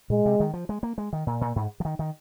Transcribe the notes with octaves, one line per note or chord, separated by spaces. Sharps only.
A#2 G#3
C3
D#3
F3
G#3
A#3
G#3
D#3
A#2
A#2
G#2
F3
D#3
D#3